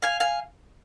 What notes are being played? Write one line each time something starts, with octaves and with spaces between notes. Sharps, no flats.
F5 G#5
F5 G#5